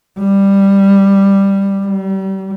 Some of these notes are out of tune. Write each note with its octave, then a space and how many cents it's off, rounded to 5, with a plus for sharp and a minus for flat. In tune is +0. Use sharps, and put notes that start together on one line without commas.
G3 +5
G3 -35